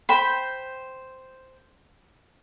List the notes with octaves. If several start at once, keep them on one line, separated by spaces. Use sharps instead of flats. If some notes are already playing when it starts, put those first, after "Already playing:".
C5 G5 B5